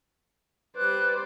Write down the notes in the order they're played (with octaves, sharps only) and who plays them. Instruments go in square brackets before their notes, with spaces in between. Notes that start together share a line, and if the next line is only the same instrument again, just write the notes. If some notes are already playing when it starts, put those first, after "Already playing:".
[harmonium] G3 B4 [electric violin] C5 D5 [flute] F#6